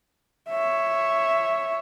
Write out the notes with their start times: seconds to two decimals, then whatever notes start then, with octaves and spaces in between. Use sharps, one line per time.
0.50 C#5 E5